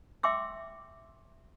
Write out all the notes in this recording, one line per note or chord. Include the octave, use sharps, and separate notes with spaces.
E5 G5 C6 D6 E6